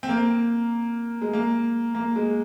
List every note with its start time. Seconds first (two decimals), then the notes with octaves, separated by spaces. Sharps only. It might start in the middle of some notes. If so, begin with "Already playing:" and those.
0.03 C4
0.09 A#3
1.21 G#3
1.33 A#3
1.95 A#3
2.16 G#3